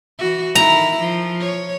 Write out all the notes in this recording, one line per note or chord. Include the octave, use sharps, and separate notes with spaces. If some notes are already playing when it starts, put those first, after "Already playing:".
E3 F#4
D#3 E4 A#5
F3
C#5